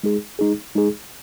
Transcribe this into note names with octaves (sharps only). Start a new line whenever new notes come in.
G#3 D#4 G#4
G#3 D#4 G#4
G#3 D#4 G#4